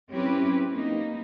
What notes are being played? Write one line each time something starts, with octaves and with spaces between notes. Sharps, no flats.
F#3 C4 C#4 E4 G4 B4
A#3 D#4